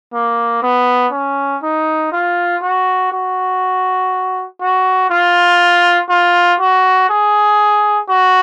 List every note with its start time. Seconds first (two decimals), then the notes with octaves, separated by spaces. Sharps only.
0.14 A#3
0.62 B3
1.12 C#4
1.63 D#4
2.12 F4
2.62 F#4
3.12 F#4
4.61 F#4
5.11 F4
6.09 F4
6.60 F#4
7.10 G#4
8.09 F#4